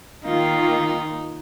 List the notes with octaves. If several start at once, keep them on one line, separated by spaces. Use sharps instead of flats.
D#3 A#3 D#4 F4